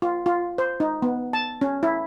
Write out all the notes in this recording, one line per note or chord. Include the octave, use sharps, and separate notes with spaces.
F4
F4
C5
D#4
B3
A5
C#4
E4